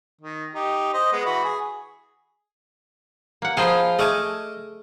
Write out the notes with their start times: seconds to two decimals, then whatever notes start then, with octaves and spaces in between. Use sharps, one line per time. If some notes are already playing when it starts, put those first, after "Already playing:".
0.21 D#3
0.55 D#4 G4
0.93 C5 D#5
1.12 G#3 B3
1.26 E3 F#4 B5
1.44 G#4
3.42 A#3 F#5
3.57 F3 F4 G#4 C5 D#5 G#5 A#5 B5
3.99 A3 G#4 D#5 G#5 A5 D6 F6